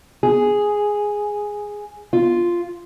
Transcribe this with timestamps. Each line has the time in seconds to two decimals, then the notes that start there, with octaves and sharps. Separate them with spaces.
0.23 G#4
2.13 F4